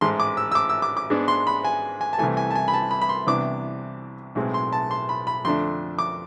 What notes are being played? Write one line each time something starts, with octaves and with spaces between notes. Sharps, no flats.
A1 G#2 G#3 C6
D6
E6
E6
D6
E6
D6
D6
G#2 G#3 B3 D4
C6
B5
G#5
G#5
A5
C2 C3 E3 A3 G#5
G#5
A5
G#5
B5
A5
B5
B5
C6
C2 C3 E3 B3 D4 D6
B1 A2 G#3 C4
C6
A5
C6
B5
B5
F2 D3 A3 D4 C6
D6